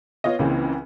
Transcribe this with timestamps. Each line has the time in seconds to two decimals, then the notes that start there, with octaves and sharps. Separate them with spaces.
0.24 B3 F4 C#5 D#5
0.39 C#2 C#3 E3 A#3 C4